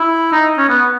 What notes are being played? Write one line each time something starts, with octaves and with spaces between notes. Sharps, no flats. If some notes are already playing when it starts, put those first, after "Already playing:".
Already playing: E4
D#4
C#4
B3